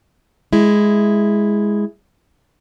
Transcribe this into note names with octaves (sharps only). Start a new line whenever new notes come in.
G#3 E4